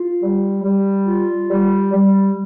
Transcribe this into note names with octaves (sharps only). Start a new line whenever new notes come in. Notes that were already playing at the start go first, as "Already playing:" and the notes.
Already playing: F4
G3
G3
F4
G3
G3